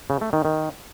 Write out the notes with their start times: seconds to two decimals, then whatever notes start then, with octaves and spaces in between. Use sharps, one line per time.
0.10 C#3
0.21 A3
0.33 D#3
0.45 D#3